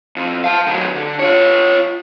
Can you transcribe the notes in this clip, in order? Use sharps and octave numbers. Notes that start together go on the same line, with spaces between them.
F2
F5 A5
D#3 F#3
D3
F4 C#5